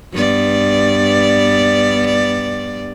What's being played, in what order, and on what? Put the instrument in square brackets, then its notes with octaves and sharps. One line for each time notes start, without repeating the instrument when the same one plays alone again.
[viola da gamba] G2 B3 D5